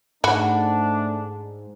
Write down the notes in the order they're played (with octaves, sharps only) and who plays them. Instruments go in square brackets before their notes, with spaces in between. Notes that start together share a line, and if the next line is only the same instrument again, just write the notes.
[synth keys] G#2 [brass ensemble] A3 D4 [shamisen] F#4 [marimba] F#5 B5